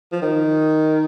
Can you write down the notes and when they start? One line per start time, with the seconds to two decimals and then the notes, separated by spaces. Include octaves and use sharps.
0.12 F3
0.22 D#3